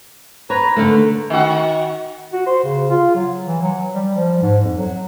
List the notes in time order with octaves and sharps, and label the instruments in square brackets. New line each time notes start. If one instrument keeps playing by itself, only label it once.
[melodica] B4 A#5 [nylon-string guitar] C#5
[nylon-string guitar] D3 A3 [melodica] A#4
[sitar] D#3 F#4
[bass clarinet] F#4
C5
C#3
F4
F#3
E3
F#3
G3
F3
G#2
F2
F#3